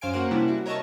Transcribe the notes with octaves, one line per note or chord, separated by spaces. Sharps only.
F#2 C5 F5 G#5 D7
A#3 C#4 F#4 A#4 C5 F#5
C3 G3 C#4 D4 E4
F#4
A#4 C#5 D#5 E5 A5 C#6